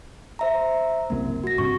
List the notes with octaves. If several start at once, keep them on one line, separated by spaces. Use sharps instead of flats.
C5 E5 A#5
F#1 C2 A#3
F#4 A#6
G2 C3 C#6